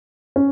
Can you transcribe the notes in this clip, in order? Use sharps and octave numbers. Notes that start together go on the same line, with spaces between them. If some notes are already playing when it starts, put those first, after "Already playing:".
C#4